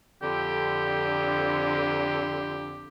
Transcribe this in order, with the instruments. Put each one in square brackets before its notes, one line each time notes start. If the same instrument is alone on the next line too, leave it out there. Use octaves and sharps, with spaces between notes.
[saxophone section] F2 D3 [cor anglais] G4